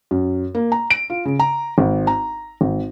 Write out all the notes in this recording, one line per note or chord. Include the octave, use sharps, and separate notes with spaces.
F#2
A#3
A#5
D7
F4
C#3
A#5
G#1
A#5
G#1